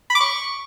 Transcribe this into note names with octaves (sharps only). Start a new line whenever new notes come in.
B5
D6
C#6